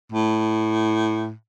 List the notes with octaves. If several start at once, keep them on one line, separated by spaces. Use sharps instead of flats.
A2